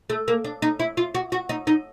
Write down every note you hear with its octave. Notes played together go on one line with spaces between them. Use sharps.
A3
A#3
D4
D#4
E4
F4
F#4
F#4
D#4
D#4